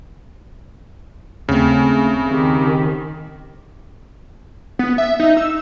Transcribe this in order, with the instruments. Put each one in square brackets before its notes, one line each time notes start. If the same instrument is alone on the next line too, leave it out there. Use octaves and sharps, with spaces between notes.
[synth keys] D#2 C4 [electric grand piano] C#3 [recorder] A3
[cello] D#3 [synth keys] C4 [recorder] G4
[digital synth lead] B3
E5
D#4
E6